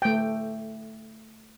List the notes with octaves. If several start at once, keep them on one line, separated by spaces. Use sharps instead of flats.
A3 G5